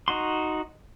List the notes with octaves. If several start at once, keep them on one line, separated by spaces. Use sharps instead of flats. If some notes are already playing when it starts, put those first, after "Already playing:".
D#4 F#4 C6